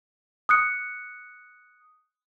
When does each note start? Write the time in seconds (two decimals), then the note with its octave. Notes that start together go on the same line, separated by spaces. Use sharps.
0.49 D#6 F#6 C#7